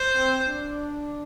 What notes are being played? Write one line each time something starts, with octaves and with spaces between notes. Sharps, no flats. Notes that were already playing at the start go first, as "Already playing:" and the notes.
Already playing: C5
C4
D4